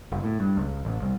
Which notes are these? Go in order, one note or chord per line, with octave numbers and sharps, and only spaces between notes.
F#1
A2
G2
C#2
A1
C2